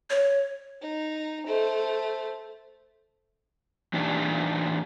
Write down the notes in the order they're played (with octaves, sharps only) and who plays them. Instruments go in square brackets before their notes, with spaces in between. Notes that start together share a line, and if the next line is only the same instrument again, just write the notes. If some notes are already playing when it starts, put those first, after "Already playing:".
[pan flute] C#5
[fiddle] D#4
A3 C5
[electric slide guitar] A2 E3 D4 D#4 G4 D5